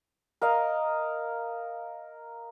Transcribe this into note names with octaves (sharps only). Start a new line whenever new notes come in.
A#4 D#5 F5